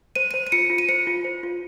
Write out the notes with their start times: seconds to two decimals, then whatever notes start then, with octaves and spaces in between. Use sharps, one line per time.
0.15 C5 D#7
0.31 C5 D#7
0.47 D#7
0.52 F4 C#7
0.70 F4
0.78 D#7
0.89 C5 C#7
1.07 F4
1.25 C5
1.43 F4